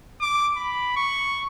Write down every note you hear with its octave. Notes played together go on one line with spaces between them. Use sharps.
D6
B5
C#6